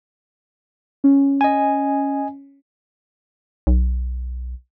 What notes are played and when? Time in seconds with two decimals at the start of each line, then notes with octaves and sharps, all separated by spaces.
1.04 C#4
1.41 D#5 G#5
3.67 B1